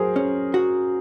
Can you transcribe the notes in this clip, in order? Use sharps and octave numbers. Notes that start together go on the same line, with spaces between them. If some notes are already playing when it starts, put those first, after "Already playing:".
Already playing: F#3 G#4 A#4 C5
C#4
F#4